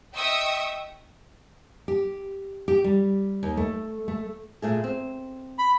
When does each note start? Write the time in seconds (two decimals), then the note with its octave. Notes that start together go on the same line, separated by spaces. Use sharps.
0.14 D#5 E5 G5 C#6 D#6 E6
1.88 G4
2.68 G4
2.84 G3
3.43 D#2
3.57 A3
4.08 A3
4.62 A#2 A3 G#4
4.84 C4
5.59 B5